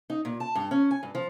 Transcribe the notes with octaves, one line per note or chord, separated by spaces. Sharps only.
D#4
A#2
A5
G2
C#4
G#5
G2
F3